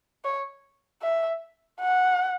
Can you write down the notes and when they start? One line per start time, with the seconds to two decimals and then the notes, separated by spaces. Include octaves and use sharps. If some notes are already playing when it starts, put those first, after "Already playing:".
0.25 C#5
1.03 E5
1.81 F#5